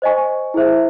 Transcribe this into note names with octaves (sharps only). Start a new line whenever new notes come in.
C5 D#5 G#5 C#6
E4 G#4 C5 E5